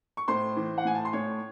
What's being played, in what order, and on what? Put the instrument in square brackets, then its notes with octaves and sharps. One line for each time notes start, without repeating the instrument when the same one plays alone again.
[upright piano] C#6
A2 C5 C6
E3
F#5
A2 G#5
A5
C6
A2 C#5 C#6